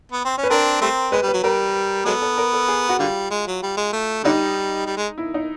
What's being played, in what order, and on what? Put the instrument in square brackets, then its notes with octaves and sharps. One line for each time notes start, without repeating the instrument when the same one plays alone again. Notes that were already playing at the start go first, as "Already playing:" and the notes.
[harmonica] B3
C4
C#4
[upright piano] B4
[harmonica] C4 D4 [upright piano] A#4
[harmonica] G3 A3 C4
[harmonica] G#3 [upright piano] B4
[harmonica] G3
[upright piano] B4
[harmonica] F#3
[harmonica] G3 [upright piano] A#4
[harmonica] F#3 G#3 B3 [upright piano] A4
[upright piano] A4
A#4
A4
G#4
F#4
[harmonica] D3 G3 [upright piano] F4
[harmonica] G#3
F#3
G3
G#3
A3
[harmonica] D3 G3 [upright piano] D#4
[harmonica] G3
G#3
[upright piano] E4
D#4